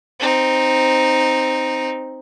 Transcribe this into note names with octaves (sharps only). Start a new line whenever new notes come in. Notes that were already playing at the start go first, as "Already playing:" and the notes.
C4 D#4